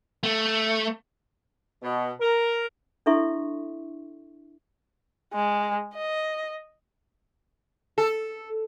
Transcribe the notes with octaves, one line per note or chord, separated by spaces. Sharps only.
A3
B2
A#4
D4 E4 A4 E5 C6 C#6
G#3
D#5
A4